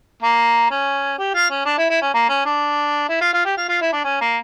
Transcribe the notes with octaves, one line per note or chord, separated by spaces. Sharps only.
A#3
C#4
G4
F4
C#4
D4
E4
E4
C#4
A#3
C#4
D4
E4
F4
F4
G4
F4
F4
E4
D4
C#4
A#3